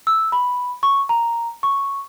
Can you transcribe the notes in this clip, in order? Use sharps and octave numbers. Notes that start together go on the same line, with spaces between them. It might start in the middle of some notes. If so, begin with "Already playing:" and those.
E6
B5
C#6
A#5
C#6